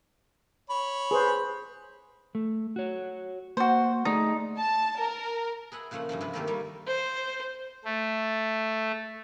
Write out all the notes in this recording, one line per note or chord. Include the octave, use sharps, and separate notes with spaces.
C#5 B5
G#4 B4 C5
A3
F#4 C#5
A#3 F#4 C5
A3 D#4 G#4 D5
A5
A#4
G#4 B4 E5 F#5
A#2 C#3 F3 A3 C#4 F#5
G2 B2 E3 F3
C3 F3 B4
D#3 E3 A3 A#3 G4 A5
G3 A#3 C#5 D#5
C5
A3